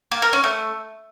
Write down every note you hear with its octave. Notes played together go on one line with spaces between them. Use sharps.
A#3
A#4
C#4
A3